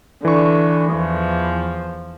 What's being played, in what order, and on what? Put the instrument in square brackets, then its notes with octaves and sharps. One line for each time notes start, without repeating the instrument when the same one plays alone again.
[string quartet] D3 [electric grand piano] E3 C#6
[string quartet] E2 F3